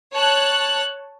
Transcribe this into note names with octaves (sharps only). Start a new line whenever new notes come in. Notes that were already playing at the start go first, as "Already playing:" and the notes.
C#5 A5 F#6